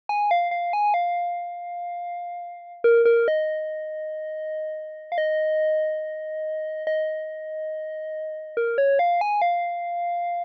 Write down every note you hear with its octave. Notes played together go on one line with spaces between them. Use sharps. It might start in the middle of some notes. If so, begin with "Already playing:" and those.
G#5
F5
F5
G#5
F5
A#4
A#4
D#5
F5
D#5
D#5
A#4
C#5
F5
G#5
F5